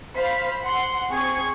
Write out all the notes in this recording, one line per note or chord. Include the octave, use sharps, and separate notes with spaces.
C5 F5 B5 B6
F#5 C6
C4 G#4 C#6 G#6